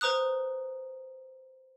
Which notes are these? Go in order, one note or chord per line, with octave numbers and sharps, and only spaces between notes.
B4 C5 A#5 D#6 F#6